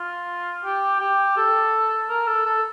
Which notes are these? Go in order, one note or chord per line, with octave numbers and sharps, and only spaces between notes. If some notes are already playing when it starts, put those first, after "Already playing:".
Already playing: F4
G4
G4
A4
A#4
A4
A4